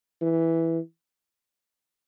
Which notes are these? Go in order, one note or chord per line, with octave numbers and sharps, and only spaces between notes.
E3